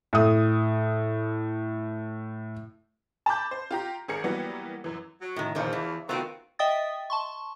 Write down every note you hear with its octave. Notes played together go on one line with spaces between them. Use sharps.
A2 D#6
A5 B5 D6 G6
C5
F4 G4 A#5
G#1 G#4 A#4 C#7
E3 F#3 G3 A#3 B3
F#2 E3
F#3
A2 D#3
E2 A#2 D#3 F3 C5
E3
D#3 A3 B3 C4 F4 F#4
D#5 E5 G5 D#6 A6
A5 C6 C#6